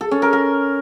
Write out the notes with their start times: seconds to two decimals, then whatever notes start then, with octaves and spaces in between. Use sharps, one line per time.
0.01 A4
0.11 C#4
0.22 A#4
0.33 A#4